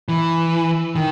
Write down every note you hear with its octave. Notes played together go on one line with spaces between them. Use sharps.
E3
D#3